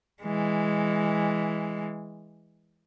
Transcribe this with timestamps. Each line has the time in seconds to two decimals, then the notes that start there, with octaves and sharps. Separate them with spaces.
0.23 E3 G#3